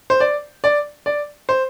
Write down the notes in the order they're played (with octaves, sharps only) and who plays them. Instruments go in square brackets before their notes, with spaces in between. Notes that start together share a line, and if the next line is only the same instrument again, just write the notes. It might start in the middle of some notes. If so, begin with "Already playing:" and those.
[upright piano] C5
D5
D5
D5
C5